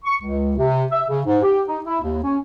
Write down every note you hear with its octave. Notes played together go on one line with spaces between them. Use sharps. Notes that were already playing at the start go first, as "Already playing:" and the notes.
C#6
C#2
C3
E5
C#3
G#2
G4
D#4
E4
D#2
C#4